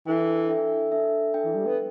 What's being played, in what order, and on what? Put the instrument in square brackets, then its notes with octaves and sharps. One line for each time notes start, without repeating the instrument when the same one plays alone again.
[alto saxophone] E3 [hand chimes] D4 A4 E5 G5
[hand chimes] D4 A4 E5 G5
D4 A4 E5 G5
D4 A4 E5 G5
[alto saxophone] E3
G3
B3